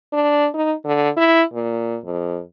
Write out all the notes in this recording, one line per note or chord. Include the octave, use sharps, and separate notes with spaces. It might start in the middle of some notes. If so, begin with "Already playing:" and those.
D4
D#4
D3
E4
A#2
F2